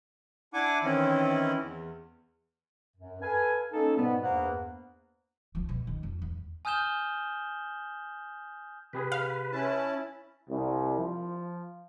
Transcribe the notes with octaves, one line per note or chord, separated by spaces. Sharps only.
D4 E4 F#5 G#5 D6
D#3 E3 C4 C#4 E4
E2
F#2
A4 B4 F5 G#5
A#3 C#4 D#4 A4
G#2 B2 G3 B3
E2 G2 A#3 B3 C5 F#5
F3
B2
D#3
F2
E2
G#5 D#6 F6 G6 E7 G7
C3 G4 G#4 B4
F5
C#4 E4 A5
C2
F3